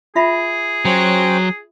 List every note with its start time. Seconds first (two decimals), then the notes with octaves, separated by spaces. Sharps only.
0.16 F4 G#4 E5 B5
0.85 F#3 C#4 C5 G5